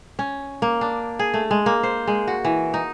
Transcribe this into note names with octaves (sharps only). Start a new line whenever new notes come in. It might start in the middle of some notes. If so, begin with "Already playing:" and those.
C#4
A#3
D4
G#4
A3
G#3
A#3
C5
G#3
F#4
E3
D#4